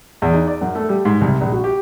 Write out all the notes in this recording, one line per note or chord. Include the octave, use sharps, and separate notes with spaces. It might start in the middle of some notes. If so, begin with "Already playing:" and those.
E2
D#4
D5
F#2
A3
G3
G#2
C2
A#1
F#4
G4